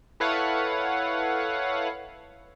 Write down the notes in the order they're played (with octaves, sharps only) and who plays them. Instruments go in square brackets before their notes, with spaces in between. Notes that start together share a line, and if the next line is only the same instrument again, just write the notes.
[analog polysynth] E4 A4 B4 C#5 F5 F#5